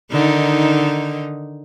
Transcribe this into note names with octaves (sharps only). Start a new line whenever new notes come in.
D3 D#3 D#4